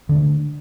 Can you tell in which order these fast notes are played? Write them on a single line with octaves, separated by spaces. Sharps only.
D3 D4 A3